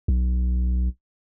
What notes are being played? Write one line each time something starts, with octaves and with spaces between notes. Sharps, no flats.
B1